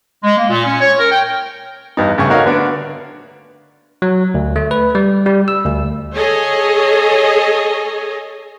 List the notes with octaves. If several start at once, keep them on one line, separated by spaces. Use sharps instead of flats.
G#3
A#3
A#2
C#4
C#5
A#4
G5
E2 G2 D#4
G2 C#3 A3 G#5 C#6
A3 D#4 F#4 A#4 C#5 F5
D3 B3 D4
F#3
D2
A3
B4
G3
G3
E6
D2
G#4 A4 C#5 D#5 G#5